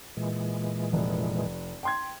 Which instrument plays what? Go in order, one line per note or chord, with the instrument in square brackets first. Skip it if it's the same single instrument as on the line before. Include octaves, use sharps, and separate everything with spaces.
[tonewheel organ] A#2 E3 G#3
[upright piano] F1
G5 C6 G#6